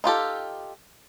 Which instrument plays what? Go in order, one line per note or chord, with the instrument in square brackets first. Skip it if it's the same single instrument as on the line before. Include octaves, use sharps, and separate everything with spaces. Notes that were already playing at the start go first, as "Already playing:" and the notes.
[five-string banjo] D#4 F4 G4 A4